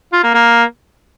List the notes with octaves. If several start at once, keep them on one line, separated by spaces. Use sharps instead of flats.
F4
A#3
A#3